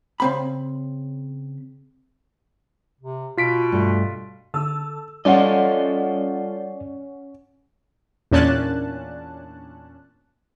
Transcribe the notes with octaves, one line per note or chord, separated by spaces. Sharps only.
C#3 C4 B5
C3
B2 F4 B6 D7
G2 A3
D3 A4 A5 E6
G3 C#4 F4 A4 D5 D#5 F#5
E2 A#2 C#4 D4 A5 F#6